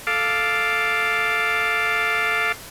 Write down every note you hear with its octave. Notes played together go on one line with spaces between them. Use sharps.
A4 F5 D6